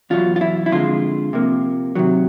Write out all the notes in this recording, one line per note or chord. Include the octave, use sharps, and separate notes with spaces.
E2 B2 F#3 F4
F4
E4
E4
F2 D3 F3 G#3 F4
C3 F3 A#3
C3 D#3 F#3